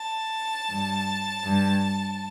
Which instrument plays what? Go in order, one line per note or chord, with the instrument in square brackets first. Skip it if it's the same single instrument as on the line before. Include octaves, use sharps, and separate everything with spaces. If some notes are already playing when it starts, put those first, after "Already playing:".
Already playing: [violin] A5
[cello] G2
G2